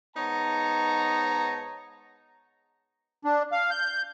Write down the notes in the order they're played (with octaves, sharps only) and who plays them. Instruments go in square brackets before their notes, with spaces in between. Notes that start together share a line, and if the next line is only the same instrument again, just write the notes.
[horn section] G#2 B3 D#4 C#5 A5 A#5
[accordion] D4
F5
G6